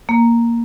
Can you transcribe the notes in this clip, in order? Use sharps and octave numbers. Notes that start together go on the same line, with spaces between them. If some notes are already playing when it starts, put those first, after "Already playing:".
A#3